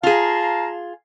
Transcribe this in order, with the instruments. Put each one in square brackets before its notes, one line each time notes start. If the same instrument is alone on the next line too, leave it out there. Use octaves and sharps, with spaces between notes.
[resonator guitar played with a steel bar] F4 G#4 [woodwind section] F5 A5 A#5